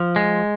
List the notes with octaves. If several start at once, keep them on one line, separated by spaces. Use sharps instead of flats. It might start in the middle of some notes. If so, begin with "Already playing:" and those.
Already playing: F3
G#3